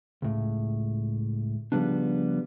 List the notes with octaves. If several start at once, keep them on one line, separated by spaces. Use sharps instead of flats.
C#2 A2
C#3 F3 G3 B3 D4